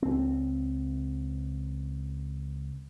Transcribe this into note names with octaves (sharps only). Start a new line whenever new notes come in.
C#2 C4